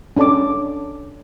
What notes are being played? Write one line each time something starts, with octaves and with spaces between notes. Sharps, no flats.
C#4 D4 A4 A5 D6